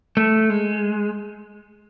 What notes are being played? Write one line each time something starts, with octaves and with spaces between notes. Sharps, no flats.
A3
G#3